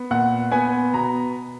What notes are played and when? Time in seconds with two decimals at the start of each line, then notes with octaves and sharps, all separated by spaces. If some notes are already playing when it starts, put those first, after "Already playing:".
Already playing: B3
0.11 A#2 F#5
0.52 B3 G#5
0.94 B2 A#5